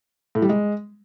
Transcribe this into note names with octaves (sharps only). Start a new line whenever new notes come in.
A2
G3
G#3